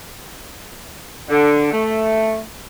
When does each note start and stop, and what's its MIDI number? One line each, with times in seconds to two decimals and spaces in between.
1.29 1.71 50
1.72 2.41 57